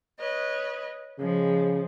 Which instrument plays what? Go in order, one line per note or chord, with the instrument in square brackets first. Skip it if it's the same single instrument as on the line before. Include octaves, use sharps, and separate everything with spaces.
[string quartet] B4 C#5 D#5
[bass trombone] C#3 [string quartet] F3 G#3